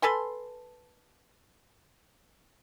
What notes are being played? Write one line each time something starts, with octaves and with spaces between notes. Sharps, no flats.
A4 B4 G#5 C6